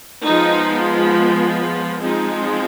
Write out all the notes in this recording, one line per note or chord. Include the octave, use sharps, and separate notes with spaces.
F3 G#3 B3 D#4
F3 G#3 C4 D#4